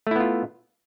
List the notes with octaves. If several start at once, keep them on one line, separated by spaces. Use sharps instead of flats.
A3 B3 E4 F4